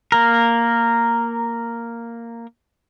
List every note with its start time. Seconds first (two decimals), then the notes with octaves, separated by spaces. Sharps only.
0.12 A#3 A#4